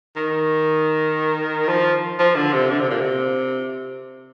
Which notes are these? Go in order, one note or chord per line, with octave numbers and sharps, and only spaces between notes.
D#3
F3
F3
D3
C3
D3
C3
A#2
C3